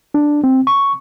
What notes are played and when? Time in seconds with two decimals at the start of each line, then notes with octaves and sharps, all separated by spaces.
0.14 D4
0.44 C4
0.67 C#6